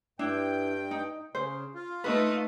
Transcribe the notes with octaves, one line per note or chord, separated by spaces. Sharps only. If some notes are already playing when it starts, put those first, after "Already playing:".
G2 D4 E4 G5
D#4
C#3 C5
F4
A3 D#4 B4 D#5